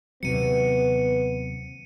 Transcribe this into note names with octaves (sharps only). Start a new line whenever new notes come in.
D#2 C3 F#3 B3 C#7 D#7